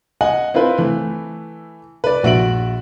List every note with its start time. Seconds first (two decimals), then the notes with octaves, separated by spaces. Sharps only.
0.21 D#5 F#5 G#5
0.54 C4 E4 F4 B4 C5
0.78 E3 A3
2.04 B4 D5
2.23 A#1 F#4 E5 D7 F#7